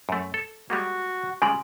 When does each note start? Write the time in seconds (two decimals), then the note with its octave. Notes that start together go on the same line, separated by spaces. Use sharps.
0.09 F#2 A3
0.34 A4
0.70 G3 G#3 A#3 F#4
1.42 C#3 G3 G#3 G#5 C6